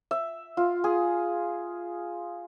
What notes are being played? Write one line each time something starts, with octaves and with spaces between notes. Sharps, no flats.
E5
F4
G#4